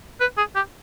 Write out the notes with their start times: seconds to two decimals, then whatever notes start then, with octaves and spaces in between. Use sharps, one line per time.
0.20 B4
0.38 G#4
0.55 G4